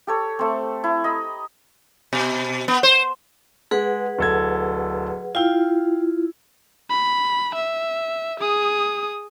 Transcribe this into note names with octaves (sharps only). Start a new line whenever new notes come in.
G4 A4 C#5
A3 C4
E4
D#5 A#5 B5
B2
B3
C5
G#3 G#4 B4 F#5
D1 A4 G#6
E4 F4 F5 G5
B5
E5
G#4 D#6